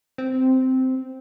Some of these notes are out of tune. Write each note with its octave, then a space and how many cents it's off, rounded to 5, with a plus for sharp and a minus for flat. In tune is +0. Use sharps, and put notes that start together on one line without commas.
C4 -10